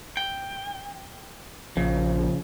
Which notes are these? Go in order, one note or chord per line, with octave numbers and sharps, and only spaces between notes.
G5
A#1 C#3 F3